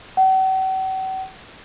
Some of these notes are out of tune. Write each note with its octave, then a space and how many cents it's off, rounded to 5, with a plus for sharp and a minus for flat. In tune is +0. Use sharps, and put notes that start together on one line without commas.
F#5 +45